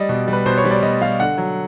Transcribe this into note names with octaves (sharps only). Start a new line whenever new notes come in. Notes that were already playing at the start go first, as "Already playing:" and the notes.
Already playing: G3 D5 D#5
B2
G3
B4
B2 C5
C#5
G3
D5
B2 D#5
G3 F5
D3 F#5
F#3